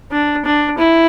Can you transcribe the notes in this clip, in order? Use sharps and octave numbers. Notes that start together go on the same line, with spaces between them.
D4
D4
E4